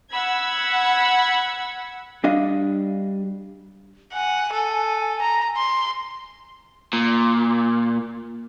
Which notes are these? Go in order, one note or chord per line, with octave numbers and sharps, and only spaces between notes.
F#5 B5 E6 G#6
G3 D4 D#5 F5
F#5 G#5
A4
A#5
C6
A#2